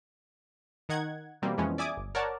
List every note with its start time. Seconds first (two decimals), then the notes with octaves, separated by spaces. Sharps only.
0.89 D#3 D#4 F#5 G#6
1.42 B2 E3 G3 A#3 C4
1.57 F2 E3 F3 G#3 B3 C#4
1.78 D5 E5 G#5 D6 D#6 G#6
1.97 G1
2.15 A#4 C#5 D5 F#5 A5